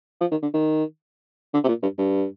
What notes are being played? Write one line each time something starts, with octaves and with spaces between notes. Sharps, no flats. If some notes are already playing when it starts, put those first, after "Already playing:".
F3
D#3
D3
D#3
D3
C3
A#2
G2
G2